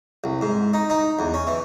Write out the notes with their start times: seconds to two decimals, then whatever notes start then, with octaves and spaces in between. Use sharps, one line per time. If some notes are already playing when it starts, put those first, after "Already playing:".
0.24 C2
0.41 G#2
0.74 D#4
0.90 D#4
1.19 E2
1.34 C#4
1.47 E3